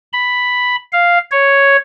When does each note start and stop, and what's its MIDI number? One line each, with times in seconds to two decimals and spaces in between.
0.13 0.76 83
0.93 1.18 77
1.31 1.76 73